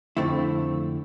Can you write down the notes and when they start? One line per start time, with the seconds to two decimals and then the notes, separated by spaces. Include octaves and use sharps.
0.17 F2 D3 A3 C4 E4